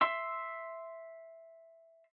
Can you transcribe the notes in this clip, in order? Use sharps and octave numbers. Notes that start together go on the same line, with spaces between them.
E5 C6 E6